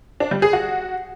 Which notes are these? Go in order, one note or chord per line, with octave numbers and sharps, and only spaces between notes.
D4
G3
G#4
F#4